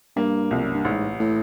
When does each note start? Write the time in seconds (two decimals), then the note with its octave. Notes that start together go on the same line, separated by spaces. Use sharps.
0.16 G2 A#3
0.51 C2 F2
0.63 F#2
0.74 G2
0.85 A1 G#2
1.20 A2